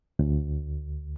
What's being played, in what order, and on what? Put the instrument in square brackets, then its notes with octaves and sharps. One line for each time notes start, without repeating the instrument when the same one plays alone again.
[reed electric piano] D2